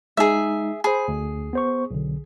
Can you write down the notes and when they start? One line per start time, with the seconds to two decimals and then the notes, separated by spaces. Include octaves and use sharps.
0.17 G#3 D#4 G#4 E5
0.84 G#4 C5 B5
1.08 D2
1.53 B3 C5 C#6
1.91 B1 D3